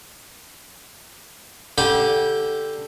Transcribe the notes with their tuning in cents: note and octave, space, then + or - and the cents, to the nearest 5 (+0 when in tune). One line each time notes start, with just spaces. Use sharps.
D3 +0 G4 +0 B5 -35